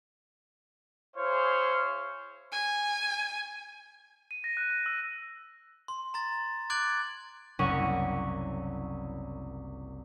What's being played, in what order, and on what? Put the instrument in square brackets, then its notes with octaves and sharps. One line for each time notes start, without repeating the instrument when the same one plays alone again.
[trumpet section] E4 G#4 C5 C#5 F5
[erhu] G#5
[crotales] D#7
A#6
F#6
F#6
E6
[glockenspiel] C6
A#5 C6 A6
D6 F#6 G#6 A6 D7 F#7
[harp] F#1 C2 C#4 F#5 C#6 D#6